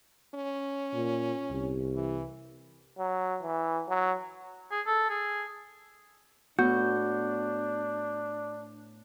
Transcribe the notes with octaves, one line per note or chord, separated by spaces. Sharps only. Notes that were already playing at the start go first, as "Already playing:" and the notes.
C#4
A#2
C2
E3
F#3
E3
F#3
G#4
A4
G#4
A2 B3 D4 F#4 G6